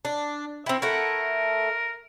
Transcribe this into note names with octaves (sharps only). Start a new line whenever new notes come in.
D4
C4 E4
A3 E4 A#4 F#5